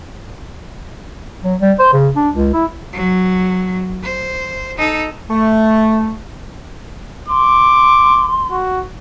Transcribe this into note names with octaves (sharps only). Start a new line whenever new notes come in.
F#3
G3
C5
C#3
D4
C#2
E4
F#3
C5
D#4 A4
A3
C6 D6
F#4